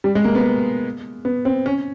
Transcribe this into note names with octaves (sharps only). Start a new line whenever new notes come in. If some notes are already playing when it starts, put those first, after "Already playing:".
G3
G#3
A#3
B3
B3
C4
C#4